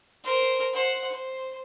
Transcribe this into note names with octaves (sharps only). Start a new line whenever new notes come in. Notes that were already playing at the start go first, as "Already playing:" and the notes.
A#4 C5
C5 F#5
C5